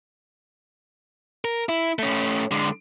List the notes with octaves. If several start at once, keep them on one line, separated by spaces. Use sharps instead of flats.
A#4
E4
A3 C#4
D3 G#3